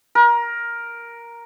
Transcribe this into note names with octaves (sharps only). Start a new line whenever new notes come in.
A#4